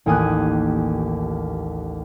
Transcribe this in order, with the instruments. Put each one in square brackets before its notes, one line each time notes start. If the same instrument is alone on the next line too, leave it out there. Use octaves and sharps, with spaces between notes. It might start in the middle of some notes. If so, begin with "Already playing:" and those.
[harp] A1 D#2 A#3 G#5 D#6 F#6